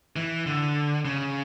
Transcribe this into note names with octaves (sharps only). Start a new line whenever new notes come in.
E3
D3
C#3